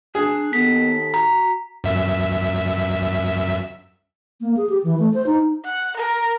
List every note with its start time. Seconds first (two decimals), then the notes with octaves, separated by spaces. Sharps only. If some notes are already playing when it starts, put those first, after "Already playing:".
0.15 D4 G#4
0.53 D#2 B3 A4 B6
1.14 F#4 A#5
1.84 F#2 E5
4.41 A#3
4.57 G#4
4.69 G4
4.84 E3
4.99 A3
5.14 C5
5.27 D#4
5.65 F#5
5.97 A#4